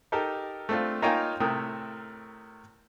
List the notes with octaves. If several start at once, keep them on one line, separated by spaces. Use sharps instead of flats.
D#4 G4 A4 A#4
A3 C4 D4 F4
A#3 D#4 F4 C#5 G5 G#5
A2 C3 A3 A#4 G5 D#6